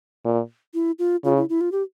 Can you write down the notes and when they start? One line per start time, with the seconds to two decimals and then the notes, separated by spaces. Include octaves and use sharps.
0.25 A#2
0.74 E4
0.99 F4
1.24 C#3 F4
1.37 E4
1.49 E4
1.61 F4
1.72 G4